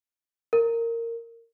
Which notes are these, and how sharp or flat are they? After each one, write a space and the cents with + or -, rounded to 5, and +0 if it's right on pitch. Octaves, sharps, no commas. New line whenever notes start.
A#4 -15